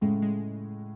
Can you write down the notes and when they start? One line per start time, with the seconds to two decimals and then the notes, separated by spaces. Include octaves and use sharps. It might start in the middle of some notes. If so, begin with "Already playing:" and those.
0.01 A2 C#3 G#3
0.22 G#3